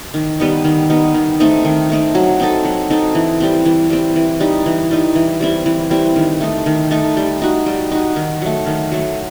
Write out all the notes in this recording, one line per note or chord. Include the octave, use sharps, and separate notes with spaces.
D#3
G3 B3 D#4
D#3
G3 B3 D#4
D#3
A3 C4 D#4
D#3
A3 C4 D#4
F#3
C4 D#4 A4
F#3
C4 D#4 A4
E3
G3 C4
E3
G3 C4
E3
G3 D#4
E3
G3 D#4
E3
G3 C4 E4
E3
G3 C4 E4
D#3
A3 D#4
D#3
A3 D#4
G3
D#4 F#4
G3
D#4 F#4
D#3
F#3 A3
D#3
F#3 A3